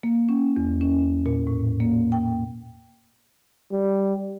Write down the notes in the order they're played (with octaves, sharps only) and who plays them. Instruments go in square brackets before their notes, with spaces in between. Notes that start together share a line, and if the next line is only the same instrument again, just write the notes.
[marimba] A#3
C#4
E2
C#4
A#2
A2
A#3
G5
[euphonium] G3